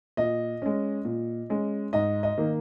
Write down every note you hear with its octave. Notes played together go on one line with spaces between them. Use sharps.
A#2 D#5
G#3 C#4
A#2
G#3 C#4
G#2 D#5
D#5
D#3 A#3